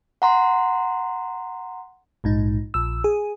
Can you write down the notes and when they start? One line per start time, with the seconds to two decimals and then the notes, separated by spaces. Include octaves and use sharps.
0.22 F#5 A#5 C6
2.24 A#1 G#2 D#4
2.74 A#1 E6
3.04 G#4